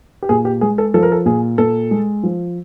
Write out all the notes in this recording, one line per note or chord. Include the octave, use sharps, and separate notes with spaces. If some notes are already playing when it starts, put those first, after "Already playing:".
G4
A#2 G#4
G4
G#3 G#4
A4
F3 A4
A#4
A4
A#2 G#4
A#2 A4
G#3
F3